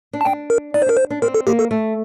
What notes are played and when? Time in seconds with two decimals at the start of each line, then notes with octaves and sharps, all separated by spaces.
0.13 D4
0.21 A5
0.25 D4 G5
0.50 A#4
0.74 D#4 D5
0.82 C5
0.86 D4 A#4
0.97 C5
1.10 D4
1.22 C4 A#4
1.34 A4
1.47 A#3 G4
1.59 A4
1.71 A3